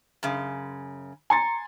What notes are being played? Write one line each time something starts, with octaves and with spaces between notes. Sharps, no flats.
F#2 C#3
G#5 A#5 C6 A6 C#7